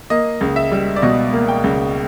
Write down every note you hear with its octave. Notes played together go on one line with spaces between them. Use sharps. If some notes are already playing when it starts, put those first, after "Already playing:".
A#3 D#5
C#2
E5
G3
D5
B2 D#5
A#3
G5
C#2